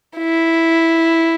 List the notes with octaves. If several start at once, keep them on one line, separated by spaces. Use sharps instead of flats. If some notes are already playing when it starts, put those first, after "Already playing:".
E4